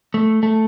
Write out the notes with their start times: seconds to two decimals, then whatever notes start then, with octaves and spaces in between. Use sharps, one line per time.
0.14 A3
0.43 A3